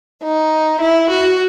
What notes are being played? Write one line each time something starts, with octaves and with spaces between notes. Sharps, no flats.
D#4
E4
F#4